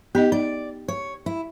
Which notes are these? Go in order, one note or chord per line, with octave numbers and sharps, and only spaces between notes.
B3 D#4 G4 D#5
D#4 D5
C#5
E4